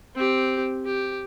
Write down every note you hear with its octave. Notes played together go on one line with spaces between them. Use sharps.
C4 G4
G4